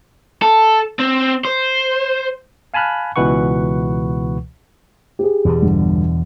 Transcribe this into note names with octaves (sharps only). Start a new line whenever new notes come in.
A4
C4
C5
F5 G#5 A5 B5 F6 F#6
C#2 B2 E3 B4 F#5 C#6
G4 G#4
E2 B2 D3
G1